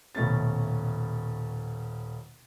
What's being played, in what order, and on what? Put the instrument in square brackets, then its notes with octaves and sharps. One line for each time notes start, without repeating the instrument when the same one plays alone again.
[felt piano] D#1 B2 A3 C#4 A6